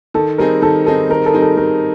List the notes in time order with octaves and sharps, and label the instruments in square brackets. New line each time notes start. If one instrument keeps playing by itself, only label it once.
[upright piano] D#3 [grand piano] A4
[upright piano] G3 C4 D#4 G#4 [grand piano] A#4
[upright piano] D#3 [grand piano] A4
[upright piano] G3 C4 D#4 G#4 [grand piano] A4
[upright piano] D#3 [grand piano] A#4
[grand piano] A4
[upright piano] G3 C4 D#4 G#4
[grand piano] A4
[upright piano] D#3 [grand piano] A#4